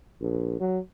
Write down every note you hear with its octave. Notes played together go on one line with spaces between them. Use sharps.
A#1
F#3